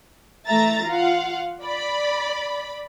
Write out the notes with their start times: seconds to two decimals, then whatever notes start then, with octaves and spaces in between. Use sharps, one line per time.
0.46 E3 A3 E5 A#5 A6
0.85 F4 F5 F#5
1.61 D5 B5